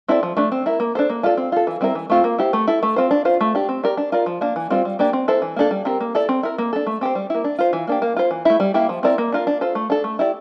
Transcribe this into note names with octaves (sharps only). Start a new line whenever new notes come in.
C4 E4 A4 D5
F3
A3 D4
C4
E4 A#4
A#3
D4 A4 C5
A#3
D4 F4 A4 D5
C4
F4 A4
E3
G3 C4 E4 A#4
E3
A3 C4 F4 A4
A#3
E4 G4 C5
A3
E4 A4
A3
C4 F4 C5
D4
F4 C5
A3
D4 G4
C4
G4 A#4 D5
D4
F4 A#4 D5
F3
A#3 D4
E3
G3 C4 F4 C5
G3
A#3 D4 G4 D5
C4
E4 A4 C5
E3
A#3 D4 A4
G3
C4 G4 A#4
A#3
E4 A4 D5
C4
E4 A#4
A#3
D4 A4
A3
C4 G4 C5
G3
A#3 E4
D4
F4 C5
E3
A#3 D4 G4
A#3
F4 C5
E3
A3 E4
G3
A#3 E4 G4
F3
C4 E4 A#4 D5
A#3
D4 F4 A#4
D4
F4 A4 C5
A3
D4 A4
A3
E4 G4 D5